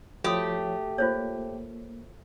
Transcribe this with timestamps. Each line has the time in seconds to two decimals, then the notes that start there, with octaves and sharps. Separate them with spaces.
0.24 F3 A3 F#4 G4 C#5 D#6
0.98 A#3 F4 C5 C#5